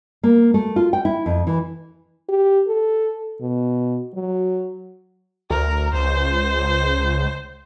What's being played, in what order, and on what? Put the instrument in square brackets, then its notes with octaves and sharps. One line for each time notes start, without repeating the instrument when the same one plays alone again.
[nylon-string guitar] A#3
A3
F4
G5
E4
F2
E3
[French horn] G4
A4
B2
F#3
[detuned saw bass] D2 [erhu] A#4
[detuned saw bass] C#2 [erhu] C5